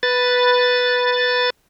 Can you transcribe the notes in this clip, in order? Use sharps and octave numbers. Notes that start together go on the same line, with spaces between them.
B4 A6